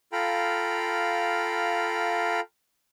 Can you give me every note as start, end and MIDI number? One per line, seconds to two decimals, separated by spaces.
0.12 2.40 65
0.12 2.40 69
0.12 2.40 77
0.12 2.40 79
0.12 2.40 82
0.12 2.40 83